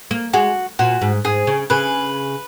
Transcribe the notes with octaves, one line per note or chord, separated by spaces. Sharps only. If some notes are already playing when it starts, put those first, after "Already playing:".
A#3
G#3 F#4
A#2 F#4
G#2
G#2 G#4
C#3
C#3 B4